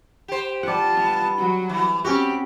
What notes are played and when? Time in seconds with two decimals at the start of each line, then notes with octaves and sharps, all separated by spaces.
0.28 G4 C5
0.63 G3 F4 F#5 A5
0.96 B3
1.37 F#3 F#4
1.69 E3
2.05 C4 C#4 F#4 G4 B5